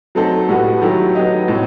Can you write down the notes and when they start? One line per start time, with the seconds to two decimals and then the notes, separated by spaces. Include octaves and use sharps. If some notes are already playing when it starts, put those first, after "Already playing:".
0.15 F#3 A3 C4 D#4 A4
0.49 A2 G3 B3 F#4 A4
0.82 D#3 F#3 A3 E4 G4
1.15 F#3 B3 D#4 G4 D#5
1.48 A2 F#3 C4